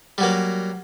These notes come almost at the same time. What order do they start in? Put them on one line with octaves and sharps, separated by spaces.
G3 F#3 A#3